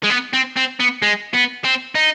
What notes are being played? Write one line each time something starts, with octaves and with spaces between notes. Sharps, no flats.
G#3
B3
C4
C4
B3
G#3
B3
C4
D#4